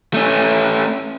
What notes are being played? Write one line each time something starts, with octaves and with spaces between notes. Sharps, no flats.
A3 C#4